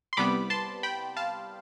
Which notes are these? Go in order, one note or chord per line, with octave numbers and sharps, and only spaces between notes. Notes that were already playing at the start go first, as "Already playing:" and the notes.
C6
C2 C3 G3 B3 B5 D6
A5 C6
G5 B5
F5 A5